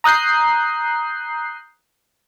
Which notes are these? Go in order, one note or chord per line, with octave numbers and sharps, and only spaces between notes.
A#5 D#6 F#6 G6 C7